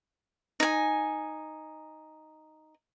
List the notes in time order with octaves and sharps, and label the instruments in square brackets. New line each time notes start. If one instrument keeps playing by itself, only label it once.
[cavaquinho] D#4 G#5